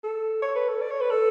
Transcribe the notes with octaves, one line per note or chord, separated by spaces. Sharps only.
A4
C#5
B4
A4
D5
C#5
B4
A4